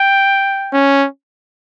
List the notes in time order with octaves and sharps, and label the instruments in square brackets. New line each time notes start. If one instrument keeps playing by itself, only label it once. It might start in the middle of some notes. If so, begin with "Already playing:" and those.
Already playing: [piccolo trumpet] G5
[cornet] C#4